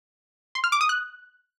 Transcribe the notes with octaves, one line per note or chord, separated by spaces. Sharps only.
C6
F6
D6
D#6
F#6